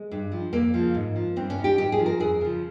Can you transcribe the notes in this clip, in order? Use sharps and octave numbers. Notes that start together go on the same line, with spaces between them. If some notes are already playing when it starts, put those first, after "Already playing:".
Already playing: G#3
G2
F3
F2 A#3
C#3 F3
G#2
F3
G2 C4
C#4
D#3
G4
G#2 G4
G#4
F3
A#4
F2 G#4
C#3 F3